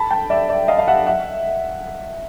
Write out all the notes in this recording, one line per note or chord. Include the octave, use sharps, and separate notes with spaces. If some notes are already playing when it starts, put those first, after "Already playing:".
Already playing: A5 B5
G5 A5
D5 E5
D5 E5
D#5 F5
F5
E5 F#5
E5 F#5